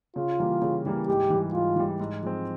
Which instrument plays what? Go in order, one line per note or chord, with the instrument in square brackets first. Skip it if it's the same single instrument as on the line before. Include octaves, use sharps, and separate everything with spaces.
[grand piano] C#3 [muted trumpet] F4
[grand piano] E3 G3 A#3
C#3
E3 G3 A#3
[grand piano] G#2 [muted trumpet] G4
[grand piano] E3 G3
[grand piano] G#2 [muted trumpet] F4
[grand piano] E3 G3
G#2
F3 G#3 C4